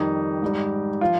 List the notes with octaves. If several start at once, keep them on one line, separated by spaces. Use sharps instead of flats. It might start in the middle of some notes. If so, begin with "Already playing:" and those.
Already playing: F2 D#3 G3 D#4
G#2 G3
F3 F4